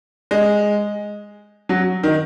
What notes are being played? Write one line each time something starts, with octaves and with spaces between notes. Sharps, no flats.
G#3
F#3
D#3